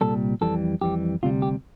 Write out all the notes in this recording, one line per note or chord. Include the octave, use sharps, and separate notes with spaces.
C2 A#2 G3 A4
F2 E3 G3 A4
F2 E3 G3 G4
D2 C3 G3 F4
G4